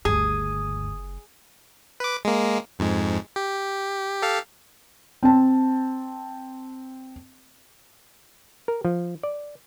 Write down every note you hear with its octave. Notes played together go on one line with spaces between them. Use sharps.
F#1 D2 G2 G#4 D#6
B4 D6
G#3 A#3
F2 G#2 G#3
G4
G4 A4 F5
C4 A5
A#4
F3
D5